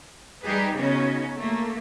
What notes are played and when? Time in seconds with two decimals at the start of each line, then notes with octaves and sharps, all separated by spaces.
0.44 G3 D#4 G4 G#4 B4
0.75 C#3 B3 C#4 D#4 F#4
1.36 A3 A#3